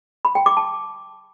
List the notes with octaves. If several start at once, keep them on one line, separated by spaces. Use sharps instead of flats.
B5
G5
D6
A5